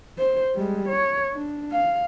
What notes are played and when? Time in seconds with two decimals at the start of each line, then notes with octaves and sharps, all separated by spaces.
0.19 C5
0.55 G3 G#3
0.88 C#5
1.32 D4
1.72 F5